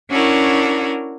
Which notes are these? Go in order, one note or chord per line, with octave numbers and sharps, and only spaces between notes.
C#4 D4 E4 F#4 A#4